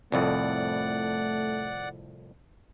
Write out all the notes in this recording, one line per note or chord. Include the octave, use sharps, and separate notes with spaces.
C2 F2 A2 A3 D5 F#5